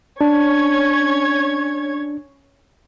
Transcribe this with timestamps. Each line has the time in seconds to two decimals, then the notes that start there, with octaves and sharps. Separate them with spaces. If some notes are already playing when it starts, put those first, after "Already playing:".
0.21 C#4 D4 C#5 G#6